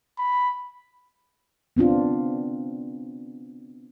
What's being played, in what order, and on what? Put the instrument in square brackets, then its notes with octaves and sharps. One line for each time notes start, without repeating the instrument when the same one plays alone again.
[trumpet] B5
[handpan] B3 C4 D4 F4